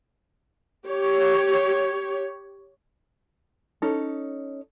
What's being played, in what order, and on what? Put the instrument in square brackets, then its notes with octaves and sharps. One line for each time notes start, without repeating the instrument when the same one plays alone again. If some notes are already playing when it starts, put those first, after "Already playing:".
[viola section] G4 C#5
[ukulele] C#4 D#4 A4